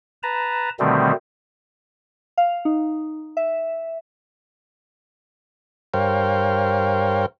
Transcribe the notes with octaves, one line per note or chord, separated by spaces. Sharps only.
B4 A5 A#5
B2 D3 D#3 G3 A3 C4
F5
D#4
E5
G2 A#4 C5 C#5 F5 G5